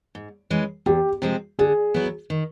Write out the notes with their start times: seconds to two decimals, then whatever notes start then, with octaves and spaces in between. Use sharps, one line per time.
0.15 G#2
0.50 E3 G#3 C#4
0.86 E2 G4
1.22 C3 F3 G#3 C4
1.59 D3 G#4
1.94 F#3 B3 E4
2.30 D#3